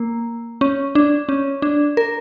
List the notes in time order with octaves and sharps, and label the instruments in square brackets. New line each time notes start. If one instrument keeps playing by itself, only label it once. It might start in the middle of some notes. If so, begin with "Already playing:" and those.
Already playing: [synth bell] A#3
C#4
D4
C#4
D4
A#4